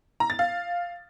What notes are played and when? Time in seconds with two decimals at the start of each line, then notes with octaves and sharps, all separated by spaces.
0.20 A#5
0.30 A6
0.39 F5